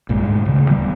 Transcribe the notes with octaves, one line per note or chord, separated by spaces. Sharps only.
A#1 G2 A#2 G#3
D2 G#2 G#3
D2 C#3
D#1 D3 G3 B3